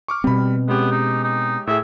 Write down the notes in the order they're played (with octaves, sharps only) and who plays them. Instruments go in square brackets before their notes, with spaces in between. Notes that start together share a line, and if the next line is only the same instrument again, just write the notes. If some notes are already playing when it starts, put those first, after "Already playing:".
[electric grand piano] C#6 D6 F6
[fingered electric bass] B2 C4 [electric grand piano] G3 B5
[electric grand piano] G#3 C#4 G4 [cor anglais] B3
[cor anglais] D#4
D#4
[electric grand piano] A2 G#4 [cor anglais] E5